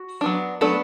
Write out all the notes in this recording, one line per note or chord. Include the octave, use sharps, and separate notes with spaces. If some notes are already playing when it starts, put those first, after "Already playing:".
Already playing: F#4
F#3 B3 D4
F#3 A3 B3 D4 A4